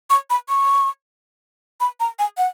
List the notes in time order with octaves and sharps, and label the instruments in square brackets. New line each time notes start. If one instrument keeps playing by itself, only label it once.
[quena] C#6
B5
C#6
B5
A#5
G#5
F#5